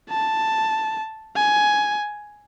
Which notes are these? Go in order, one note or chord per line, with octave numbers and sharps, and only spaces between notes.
A5
G#5